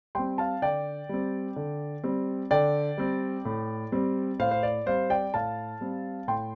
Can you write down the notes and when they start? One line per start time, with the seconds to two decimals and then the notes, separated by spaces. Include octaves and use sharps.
0.15 G3 C4 G5 C6
0.38 F5 A5
0.62 D3 D5 G5
1.09 G3 C4
1.56 D3
2.04 G3 C4
2.51 D3 D5 G5
2.98 G3 C4
3.45 A2
3.92 G3 C4
4.39 A2 C5 F5
4.51 C5
4.63 D5
4.86 G3 C4 C5 F5
5.10 D5 G5
5.34 A2 F5 A5
5.81 G3 C4
6.28 A2 G5 C6